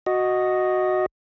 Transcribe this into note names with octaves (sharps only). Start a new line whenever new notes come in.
F#4 D#5